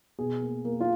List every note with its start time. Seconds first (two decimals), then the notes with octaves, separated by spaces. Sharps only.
0.19 B2 G#4
0.41 A#3
0.65 A#3
0.80 F4